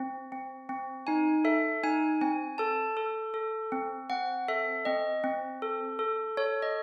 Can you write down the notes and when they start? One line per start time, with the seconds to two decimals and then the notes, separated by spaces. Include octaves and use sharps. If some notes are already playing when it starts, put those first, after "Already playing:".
Already playing: C4
0.32 C4
0.69 C4
1.07 D#4 G#5
1.44 A4 E5
1.84 D#4 G#5
2.21 C4 G#5
2.58 A4 A5
2.97 A4
3.34 A4
3.72 C4
4.10 C4 F#5
4.48 A4 E5
4.85 C4 D#5
5.24 C4
5.62 A4
5.99 A4
6.37 A4 C#5
6.62 D#5